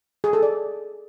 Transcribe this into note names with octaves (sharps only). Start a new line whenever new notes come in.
G#4
A4
D5